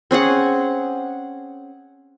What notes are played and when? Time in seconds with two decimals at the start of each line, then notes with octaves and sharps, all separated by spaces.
0.11 C4 C#4 G#4 F#5